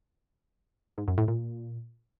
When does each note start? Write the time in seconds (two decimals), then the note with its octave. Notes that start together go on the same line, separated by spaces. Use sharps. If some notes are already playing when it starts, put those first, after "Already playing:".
0.98 G#2
1.08 F#2
1.18 A2
1.28 A#2